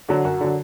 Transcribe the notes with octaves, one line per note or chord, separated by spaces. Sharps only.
D3 F#3 F#4
F#2 F#4
D3 F#3